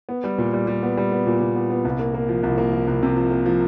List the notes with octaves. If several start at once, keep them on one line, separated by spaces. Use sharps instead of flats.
B3
G3
A#2
G3
G3
B3
G3
B3
A#2
A#2
B3
B3
C2
A#3
A#3
F3
C2
A#3
F3
C2
C3
F3
A#3
F3